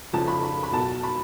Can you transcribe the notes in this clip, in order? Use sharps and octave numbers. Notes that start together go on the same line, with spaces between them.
F1 F2 C#3 F3 A5
B5
B5
B5
B1 B2 A5
B5